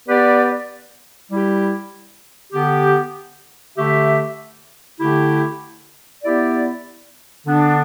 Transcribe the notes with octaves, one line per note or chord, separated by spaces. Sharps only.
B3 G4 B4 D5
G3 E4 G4
D3 B3 G4
D3 A3 G4 E5
D3 A3 E4 G4
B3 E4 G4 D5
D3 B3 D4